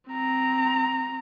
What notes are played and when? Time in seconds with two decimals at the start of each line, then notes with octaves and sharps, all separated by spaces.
0.10 C4 A#5